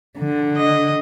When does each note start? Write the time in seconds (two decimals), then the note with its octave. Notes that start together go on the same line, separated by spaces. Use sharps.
0.19 D3
0.57 D#5